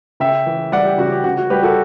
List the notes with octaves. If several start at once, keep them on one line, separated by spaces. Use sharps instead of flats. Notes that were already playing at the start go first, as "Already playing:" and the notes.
C#3 E5 G5
E3
G3 D5 F#5
G4
C#3 F#4
G4
C#3 F#4
F#4
G3 G4 B4
F#4 A4